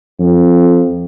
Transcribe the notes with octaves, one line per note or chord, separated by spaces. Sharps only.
F2